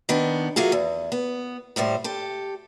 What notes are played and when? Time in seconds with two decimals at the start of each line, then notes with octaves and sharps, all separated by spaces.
0.09 D#3 B3 D4
0.56 F#3 A3 A#3 F4 G#4
0.72 E2
1.12 B3
1.76 D#2 A2 G3 C5
2.04 G4 A4